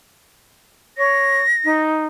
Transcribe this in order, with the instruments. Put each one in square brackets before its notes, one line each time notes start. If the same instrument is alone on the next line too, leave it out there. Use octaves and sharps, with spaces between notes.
[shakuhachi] C#5 [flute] A#6
[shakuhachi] D#4